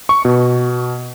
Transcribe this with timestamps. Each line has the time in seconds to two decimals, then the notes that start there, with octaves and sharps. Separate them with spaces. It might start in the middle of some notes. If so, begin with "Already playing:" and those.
0.09 C#6
0.25 B2